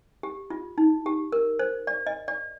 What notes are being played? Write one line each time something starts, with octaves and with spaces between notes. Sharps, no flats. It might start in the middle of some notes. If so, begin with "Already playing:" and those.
G4
F4
D#4
G4
A#4
C5
D5
D#5
D5